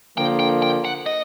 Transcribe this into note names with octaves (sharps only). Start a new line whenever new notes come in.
D3 F3 A#3 G5
G5
G5
F#5
D#5